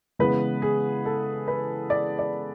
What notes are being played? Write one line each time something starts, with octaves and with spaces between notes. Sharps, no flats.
C#3 E3 G#3 B3 B4
G#4
A4
B4
D5
D5